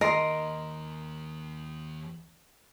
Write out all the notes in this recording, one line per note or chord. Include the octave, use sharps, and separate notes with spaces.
D#2 D#3 A#4 D#5 C6